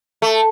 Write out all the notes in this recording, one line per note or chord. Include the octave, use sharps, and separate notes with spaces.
A3